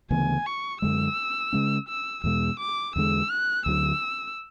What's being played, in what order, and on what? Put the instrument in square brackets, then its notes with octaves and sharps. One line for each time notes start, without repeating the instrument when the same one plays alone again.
[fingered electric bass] D2 C#3 E3 B3 [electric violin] G#5
[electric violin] C#6
[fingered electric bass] F#2 D3 G#3 [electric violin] E6
[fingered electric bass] C#3 G#3 C#4
[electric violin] E6
[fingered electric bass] E2 B2 G#3 [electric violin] E6
[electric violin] D6
[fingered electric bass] E2 D3 G#3 [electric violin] E6
[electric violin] F#6
[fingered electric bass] D2 D3 F#3 [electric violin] E6